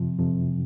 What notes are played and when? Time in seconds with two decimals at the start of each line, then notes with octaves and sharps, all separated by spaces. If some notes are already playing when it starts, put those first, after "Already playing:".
Already playing: F2 C3 F3
0.18 F2 C3 F3